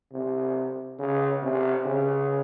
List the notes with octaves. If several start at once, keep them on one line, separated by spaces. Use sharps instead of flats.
C3
C#3
C3
C#3